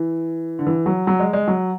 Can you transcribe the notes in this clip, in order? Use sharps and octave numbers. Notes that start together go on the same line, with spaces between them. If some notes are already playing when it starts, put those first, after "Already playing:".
Already playing: E3
D3
E3
F#3
F#3
G#3
G#3
F#3